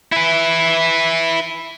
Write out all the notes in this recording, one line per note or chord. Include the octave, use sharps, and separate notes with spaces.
E4 B4